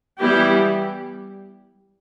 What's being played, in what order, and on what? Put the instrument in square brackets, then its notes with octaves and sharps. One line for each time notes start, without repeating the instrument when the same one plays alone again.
[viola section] E3 G3 B3 E4 G4